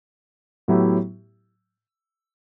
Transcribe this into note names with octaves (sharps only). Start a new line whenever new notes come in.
A2 F#3 B3 E4 G4